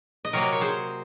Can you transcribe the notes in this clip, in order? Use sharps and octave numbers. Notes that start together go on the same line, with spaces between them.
D#5
C3 F#3 A#3 A#4 C#5
C#5
G#4 C5